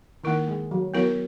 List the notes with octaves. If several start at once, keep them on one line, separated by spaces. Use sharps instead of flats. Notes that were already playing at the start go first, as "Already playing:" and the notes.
D#3 A#3 E4 A#4
G#3
F#3
F#3 B3 E4 A#4 C#5